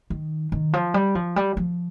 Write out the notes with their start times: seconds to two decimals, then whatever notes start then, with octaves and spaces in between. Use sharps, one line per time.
0.10 D#3
0.52 D#3
0.73 F3
0.94 G3
1.15 F3
1.36 G3
1.57 F3